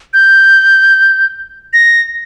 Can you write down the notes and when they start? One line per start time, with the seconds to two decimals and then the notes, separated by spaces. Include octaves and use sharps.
0.14 G6
1.73 A#6